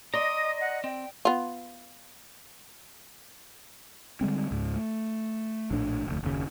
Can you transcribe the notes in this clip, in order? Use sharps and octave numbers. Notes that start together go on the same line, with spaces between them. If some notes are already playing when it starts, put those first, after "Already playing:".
D5 D#5 A#5 C6 D#6
F#5
C4 G5
B3 F4
D3 G3 G#3 C4
C#2 G#2
A3
A#1 A2 D4
F1 D2
F#1 D#2 C#3